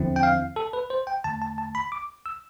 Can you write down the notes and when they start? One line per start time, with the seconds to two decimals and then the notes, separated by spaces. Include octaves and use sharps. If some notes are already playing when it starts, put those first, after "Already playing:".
Already playing: E2 D3 F3 C4 E4
0.16 G5
0.23 F5
0.56 A4
0.73 B4
0.90 C5
1.07 G5
1.24 E2 D3 A3 A5
1.42 A5
1.58 A5
1.75 B5
1.92 D6
2.26 E6